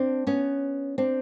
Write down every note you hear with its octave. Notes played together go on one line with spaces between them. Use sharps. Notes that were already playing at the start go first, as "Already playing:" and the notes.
Already playing: C4 D4
B3 C#4
C4 D4